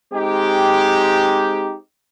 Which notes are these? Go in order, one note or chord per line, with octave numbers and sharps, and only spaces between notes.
G#3 C4 D#4 G4